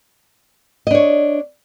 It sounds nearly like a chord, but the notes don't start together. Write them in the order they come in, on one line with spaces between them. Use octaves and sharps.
D#5 D4 C#5